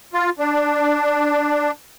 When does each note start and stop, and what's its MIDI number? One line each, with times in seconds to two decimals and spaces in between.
0.13 0.30 65
0.39 1.71 62